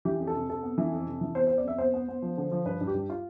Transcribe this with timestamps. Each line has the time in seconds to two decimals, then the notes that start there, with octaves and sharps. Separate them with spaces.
0.05 E3 G4
0.20 F2
0.27 A4
0.34 C3
0.49 C3 A4
0.63 B3
0.78 E3
0.92 F2
1.06 C3
1.21 E3
1.35 B3 C5
1.47 B3 C5
1.58 D5
1.64 F2 E5
1.78 B3 C5
1.94 B3
2.09 B3
2.22 F3
2.37 D3
2.52 F3
2.66 G2 B4
2.81 G2
2.87 G4
2.94 G2
3.10 F4